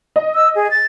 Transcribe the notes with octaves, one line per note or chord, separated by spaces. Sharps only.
D#5
E6
G#4
A6